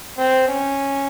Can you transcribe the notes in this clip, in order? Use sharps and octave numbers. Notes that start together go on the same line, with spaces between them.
C4
C#4